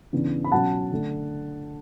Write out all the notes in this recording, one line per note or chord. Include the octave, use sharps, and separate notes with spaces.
C#3 E3 B3 D4
B5
B2 F#3 C#4 F#5 A5
D3 A3 D4